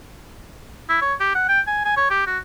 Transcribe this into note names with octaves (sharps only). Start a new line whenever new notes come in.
E4
C#5
G4
F#5
G5
G#5
G#5
C#5
G4
F#4